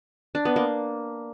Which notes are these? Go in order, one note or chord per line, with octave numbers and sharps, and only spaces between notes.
D4
B3
A#3